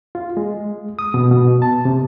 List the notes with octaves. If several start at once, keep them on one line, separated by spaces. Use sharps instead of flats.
F4
G#3
D#6
B2
B2
A5
C3